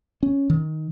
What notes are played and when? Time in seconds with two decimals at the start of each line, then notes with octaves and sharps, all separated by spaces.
0.23 C#4
0.50 D#3